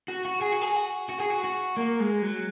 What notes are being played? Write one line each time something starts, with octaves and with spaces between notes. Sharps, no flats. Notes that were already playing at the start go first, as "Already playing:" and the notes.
F#4
F#4
G#4
F#4
G#4
F#4
F#4
G#4
F#4
F#4
A#3
G#3
F#3